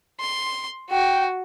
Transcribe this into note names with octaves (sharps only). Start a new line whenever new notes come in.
C6
F#4 G5